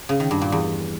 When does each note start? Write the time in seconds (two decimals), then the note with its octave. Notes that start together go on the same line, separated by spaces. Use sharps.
0.09 C#3
0.20 D#3
0.31 G2
0.41 A#2
0.52 E2